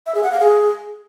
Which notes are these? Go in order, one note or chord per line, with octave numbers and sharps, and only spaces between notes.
E5
G#4
F#5
F5
G#4